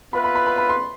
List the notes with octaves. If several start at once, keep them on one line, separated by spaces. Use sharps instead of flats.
B3 F4 B4 E5 B5
B5
B5
B5
B5
C6